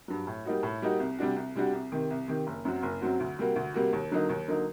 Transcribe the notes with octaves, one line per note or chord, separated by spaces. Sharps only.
G2 F#3
A2
G3 A#3 D#4 F#4
A2
G3 A#3 D#4 F#4
C2
C3 G3 D4 F#4
C2
C3 G3 D4 F#4
C2
C3 D#3
C2
C3 D#3
F#1
F#2 F#3 C4 F#4
F#1
F#2 F#3 C4 F#4
D2
C3 G3 A#3 F#4
D2
C3 G3 A#3 F#4
D#2
D3 F#3 A#3 D#4
D#2
D3 F#3 A#3 D#4